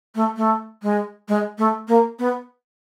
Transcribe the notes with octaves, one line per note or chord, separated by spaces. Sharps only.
A3
A3
G#3
G#3
A3
A#3
B3